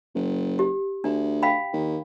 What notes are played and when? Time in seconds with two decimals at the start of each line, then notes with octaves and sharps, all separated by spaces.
0.15 F#1
0.59 G4
1.04 D2 D4
1.43 F5 G5 B5
1.73 D#2